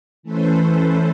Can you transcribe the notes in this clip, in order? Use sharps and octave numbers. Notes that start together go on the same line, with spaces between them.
E3 A3 C#4 A4 B4 C5